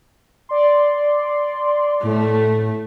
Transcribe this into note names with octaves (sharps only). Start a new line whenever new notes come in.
D5 C6
A2 A3